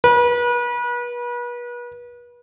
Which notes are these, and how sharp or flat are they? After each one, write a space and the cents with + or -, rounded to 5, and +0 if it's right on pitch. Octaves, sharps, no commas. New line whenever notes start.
B4 -35